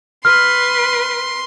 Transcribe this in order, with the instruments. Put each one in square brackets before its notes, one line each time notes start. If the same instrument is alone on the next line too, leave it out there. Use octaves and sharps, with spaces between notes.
[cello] B4 [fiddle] C6 [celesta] F6